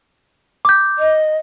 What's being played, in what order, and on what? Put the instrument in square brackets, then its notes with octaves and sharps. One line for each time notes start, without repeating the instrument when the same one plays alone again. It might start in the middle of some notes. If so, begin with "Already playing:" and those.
[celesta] D6 G6
[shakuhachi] D#5